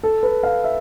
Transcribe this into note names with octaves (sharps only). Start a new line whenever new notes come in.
A4
B4
F5
E5